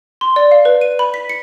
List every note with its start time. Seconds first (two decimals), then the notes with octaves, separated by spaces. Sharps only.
0.21 C6
0.36 D5
0.51 F5
0.65 B4
0.81 D#7
0.99 B5
1.14 B6
1.29 C#7